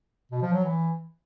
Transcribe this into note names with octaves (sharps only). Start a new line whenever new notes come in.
B2
F3
F#3
E3